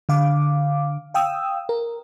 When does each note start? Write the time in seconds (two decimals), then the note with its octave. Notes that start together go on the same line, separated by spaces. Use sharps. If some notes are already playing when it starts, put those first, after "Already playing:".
0.09 D3 F5 D6
1.14 F5 G5 D#6 E6
1.69 A#4